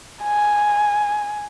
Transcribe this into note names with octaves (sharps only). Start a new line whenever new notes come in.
G#5